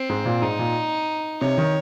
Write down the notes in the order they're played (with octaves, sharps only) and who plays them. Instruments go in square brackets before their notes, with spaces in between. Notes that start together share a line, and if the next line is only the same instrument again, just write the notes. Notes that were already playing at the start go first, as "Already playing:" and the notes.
Already playing: [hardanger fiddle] C4
[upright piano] G#2
A#2
[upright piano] G#2 [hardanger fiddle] D#4
[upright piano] A#2
[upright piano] C3 [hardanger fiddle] C#5
[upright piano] D#3